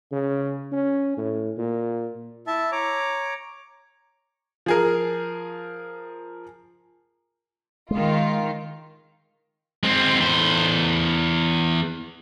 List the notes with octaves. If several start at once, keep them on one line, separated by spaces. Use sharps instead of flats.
C#3
C#4
A2
A#2
E4 E5 A5
C#5 A#5 D6
F3 G#4 A#4
D#3 G#3 F4
G#3 C4
E2 C5